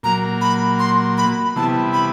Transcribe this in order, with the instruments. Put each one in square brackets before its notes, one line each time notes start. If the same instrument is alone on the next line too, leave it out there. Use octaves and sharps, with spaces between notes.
[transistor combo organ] A#2 F#3 A#3 [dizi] A#5
[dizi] B5
C6
B5
[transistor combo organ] C3 E3 G3 B3 E4 [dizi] A5
[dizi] B5